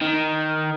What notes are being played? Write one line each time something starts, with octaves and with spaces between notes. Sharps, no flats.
D#3